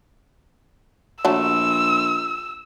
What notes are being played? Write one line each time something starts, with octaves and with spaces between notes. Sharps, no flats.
A#1 F#3 A3 A5 E6